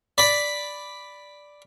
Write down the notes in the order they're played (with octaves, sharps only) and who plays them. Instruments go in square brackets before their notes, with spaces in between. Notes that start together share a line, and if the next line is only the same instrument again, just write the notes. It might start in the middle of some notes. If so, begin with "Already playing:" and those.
[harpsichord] D5 B5